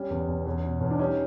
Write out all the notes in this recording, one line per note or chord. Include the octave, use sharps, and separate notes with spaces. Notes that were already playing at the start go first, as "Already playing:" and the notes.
Already playing: G3 C#4
E2
E2
E2 C#4
B2
E2 C#4
D4
G3 C#4 D#4